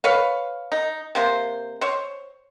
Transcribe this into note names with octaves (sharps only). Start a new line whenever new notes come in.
B4 C#5 F5
D#4
C3 A#3 C5
C5 C#5